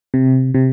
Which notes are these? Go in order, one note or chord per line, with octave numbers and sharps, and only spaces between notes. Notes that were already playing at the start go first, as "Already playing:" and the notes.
C3
C3